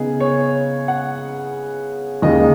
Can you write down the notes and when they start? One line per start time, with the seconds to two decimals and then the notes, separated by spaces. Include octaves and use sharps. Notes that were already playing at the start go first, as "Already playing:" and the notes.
Already playing: C#3 B3 D#4 G#4
0.20 C#5
0.88 F#5
2.22 D#2 C#3 G#3 D#4 D#5